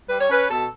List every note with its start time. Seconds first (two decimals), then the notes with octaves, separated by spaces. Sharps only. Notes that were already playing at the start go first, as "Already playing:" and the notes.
0.09 G3 B4
0.20 C#5
0.30 C#4 B4
0.50 B2 A4